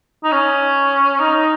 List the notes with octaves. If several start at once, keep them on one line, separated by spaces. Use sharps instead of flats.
D#4
C#4
D#4